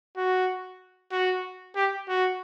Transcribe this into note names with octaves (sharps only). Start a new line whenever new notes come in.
F#4
F#4
G4
F#4